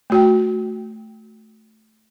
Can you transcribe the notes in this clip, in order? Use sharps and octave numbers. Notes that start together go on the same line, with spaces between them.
A3 F#4 G5